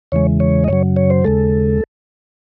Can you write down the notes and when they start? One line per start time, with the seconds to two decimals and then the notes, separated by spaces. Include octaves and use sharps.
0.12 E2 C#3 E3 G#3 C#5
0.40 C#5
0.64 D#5
0.68 F#2 C#3 F#3 C#5
0.96 C#5
1.10 C5
1.24 D#2 C#3 G#3 A4